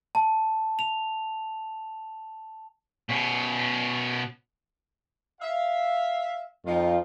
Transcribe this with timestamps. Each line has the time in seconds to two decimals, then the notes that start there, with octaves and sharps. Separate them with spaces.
0.15 A5
0.79 F7
3.09 B2 C#4
5.41 E5 F5
6.66 F2 F3 D#4 F4